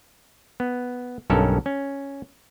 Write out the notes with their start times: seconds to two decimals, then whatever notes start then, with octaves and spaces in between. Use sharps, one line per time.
0.60 B3
1.30 B1 G2 C#4 A4 A#4
1.66 C#4